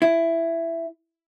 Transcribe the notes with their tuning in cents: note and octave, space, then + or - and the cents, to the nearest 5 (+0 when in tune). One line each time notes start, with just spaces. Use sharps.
E4 +10